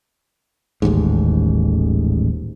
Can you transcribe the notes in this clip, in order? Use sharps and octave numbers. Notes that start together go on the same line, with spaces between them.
D#1 A1 D#2 G#2